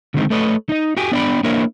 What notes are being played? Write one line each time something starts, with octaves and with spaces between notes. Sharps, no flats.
D3 D#3 G#3 C4 D4 D#4
A3 A4 B4 C#5 D#5
D#4 D#5
F#4 G4 G5 G#5
B3 D4 D5 E5 G5 B5
A#3 D4 E4 A#4 C#5 D#5